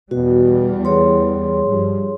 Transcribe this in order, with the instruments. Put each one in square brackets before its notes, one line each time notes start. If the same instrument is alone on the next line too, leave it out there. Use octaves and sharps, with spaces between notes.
[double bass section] E2 G3 [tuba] B2 [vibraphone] F#4
[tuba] E3 [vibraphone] G#4 C#5 C6
[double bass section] G2 F3 [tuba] G3